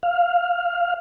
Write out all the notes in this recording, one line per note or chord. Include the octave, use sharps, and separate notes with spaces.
F5